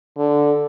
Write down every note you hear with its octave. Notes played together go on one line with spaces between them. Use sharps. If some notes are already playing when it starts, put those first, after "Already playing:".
D3